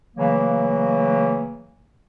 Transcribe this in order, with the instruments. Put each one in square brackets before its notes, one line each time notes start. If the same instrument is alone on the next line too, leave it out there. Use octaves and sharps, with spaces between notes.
[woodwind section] C#3 E3 F#3 A3 A#3